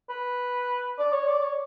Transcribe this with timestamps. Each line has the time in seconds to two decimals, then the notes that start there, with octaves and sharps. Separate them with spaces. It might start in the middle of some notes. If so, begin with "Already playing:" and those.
0.10 B4
0.98 D5
1.12 C#5
1.28 D5
1.42 C#5